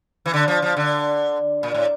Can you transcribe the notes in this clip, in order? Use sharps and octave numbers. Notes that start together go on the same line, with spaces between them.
E3
D3
F3
F3
D3
A#2
A2